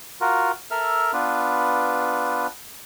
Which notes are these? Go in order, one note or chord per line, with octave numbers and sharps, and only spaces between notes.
F4 F#4 A#4
A4 A#4 E5 F6
B3 D4 F4 B4